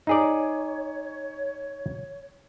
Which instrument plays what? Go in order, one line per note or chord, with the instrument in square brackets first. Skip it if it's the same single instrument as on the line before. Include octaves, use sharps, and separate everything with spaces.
[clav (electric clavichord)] D#4 G#4 D5 [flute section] C#5